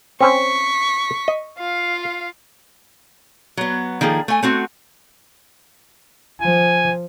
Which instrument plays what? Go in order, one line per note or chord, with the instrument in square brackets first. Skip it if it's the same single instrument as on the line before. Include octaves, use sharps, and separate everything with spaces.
[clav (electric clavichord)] C4 C#4 C5 [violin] C#6 B6
[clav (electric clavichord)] D#5
[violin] F4 F5
[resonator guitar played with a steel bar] F#3 B3
D#3 F3 A#3 G#4 A4
A3 G#5
A3 C4 F#4
[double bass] F3 [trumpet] G#5